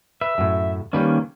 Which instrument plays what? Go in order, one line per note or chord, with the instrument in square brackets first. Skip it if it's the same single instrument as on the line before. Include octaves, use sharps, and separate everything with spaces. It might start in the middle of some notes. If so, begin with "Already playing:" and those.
[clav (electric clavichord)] B4 [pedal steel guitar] E5
[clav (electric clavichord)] F#2 A2
[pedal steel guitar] D#3 A#3 C#4 [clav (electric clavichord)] G3 B4 D5